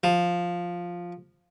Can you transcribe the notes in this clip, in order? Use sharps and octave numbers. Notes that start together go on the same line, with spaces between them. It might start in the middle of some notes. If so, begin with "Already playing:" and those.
F3